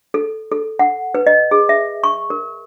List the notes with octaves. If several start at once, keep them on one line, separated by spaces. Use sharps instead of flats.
A4
A4
F#5
B4
D#5
G#4
E5
C#6
A#4